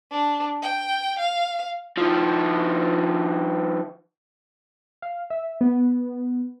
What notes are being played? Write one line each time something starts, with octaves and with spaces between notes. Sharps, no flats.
D4
G5
F5
D#3 F3
F5
E5
B3